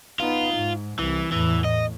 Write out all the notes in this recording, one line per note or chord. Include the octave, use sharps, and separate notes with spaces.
B3 D#4 F4
G#2
C2 E3
E2 A2 E3
A2 D#5